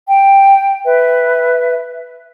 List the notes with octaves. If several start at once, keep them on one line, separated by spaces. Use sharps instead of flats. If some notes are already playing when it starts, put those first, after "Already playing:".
G5
B4 E5